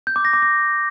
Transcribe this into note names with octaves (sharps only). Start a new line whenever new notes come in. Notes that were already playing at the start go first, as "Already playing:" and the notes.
G6
D6
A#6
D6
A#6